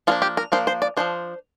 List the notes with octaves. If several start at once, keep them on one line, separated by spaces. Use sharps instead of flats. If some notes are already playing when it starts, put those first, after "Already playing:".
F3 A#3 D4 F4
G4
A#4
F3 A#3 D4 C5
C5
D5
F3 A#3 D4 C5